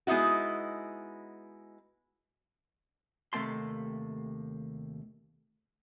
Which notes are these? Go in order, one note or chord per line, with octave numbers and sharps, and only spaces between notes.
G#3 B3 D#4 E4 F#4
D#2 C3 A3 A#3 A5 C6